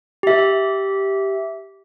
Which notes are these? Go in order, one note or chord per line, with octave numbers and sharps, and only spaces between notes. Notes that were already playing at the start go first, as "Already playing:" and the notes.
G4 E5